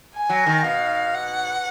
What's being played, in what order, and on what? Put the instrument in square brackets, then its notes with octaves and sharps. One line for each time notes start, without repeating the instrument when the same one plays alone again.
[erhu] G#5
[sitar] F#3
D#3
[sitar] B2 [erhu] F5
[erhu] F#5